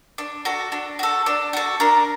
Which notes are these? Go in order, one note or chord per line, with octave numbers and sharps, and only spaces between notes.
D4
F#4 A4
D4
F#4 A4
D4
F#4 A4
D4 A#4